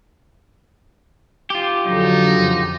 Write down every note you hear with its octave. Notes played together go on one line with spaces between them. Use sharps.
F4 G4
F2 D3 F#3 D#4
F2 C#3